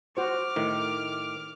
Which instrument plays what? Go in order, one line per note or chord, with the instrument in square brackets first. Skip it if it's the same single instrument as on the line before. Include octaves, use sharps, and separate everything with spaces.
[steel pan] F#4 C5 [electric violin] D6 F6
[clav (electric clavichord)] A2 D#3